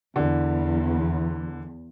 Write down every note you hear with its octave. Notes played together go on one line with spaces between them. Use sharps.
E2 D3 E3